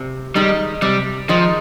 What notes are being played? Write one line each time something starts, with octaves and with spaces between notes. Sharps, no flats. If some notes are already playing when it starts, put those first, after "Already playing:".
Already playing: C3
D#3 G3 G#3 D#4
C3 G3
D#3 F3 G#3 D#4